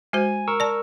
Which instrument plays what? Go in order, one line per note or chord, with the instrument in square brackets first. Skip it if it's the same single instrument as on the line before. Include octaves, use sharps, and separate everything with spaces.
[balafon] G#3 F#4 C5 [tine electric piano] G#5
[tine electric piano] A#4 C#6 E6
[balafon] D5 A5